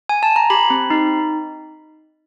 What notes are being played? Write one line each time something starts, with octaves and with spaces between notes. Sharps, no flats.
G#5
A5
A#5
G4 B5
C4
D#4